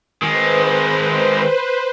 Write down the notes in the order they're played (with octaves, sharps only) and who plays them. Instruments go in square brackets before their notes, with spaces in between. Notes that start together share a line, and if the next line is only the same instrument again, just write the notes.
[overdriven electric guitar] D#3 G#3 [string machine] B4 C5